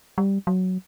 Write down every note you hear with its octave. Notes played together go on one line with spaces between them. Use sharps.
G3
F#3